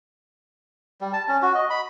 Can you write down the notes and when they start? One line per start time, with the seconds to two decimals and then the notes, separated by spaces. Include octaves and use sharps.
1.01 G3
1.13 A5
1.28 C#4
1.42 F#4
1.55 D#5
1.70 B5